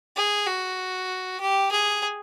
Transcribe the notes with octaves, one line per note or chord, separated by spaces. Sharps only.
G#4
F#4
G4
G#4